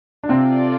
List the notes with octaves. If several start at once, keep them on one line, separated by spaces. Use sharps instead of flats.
D4
C3 C4 F4 A4 D5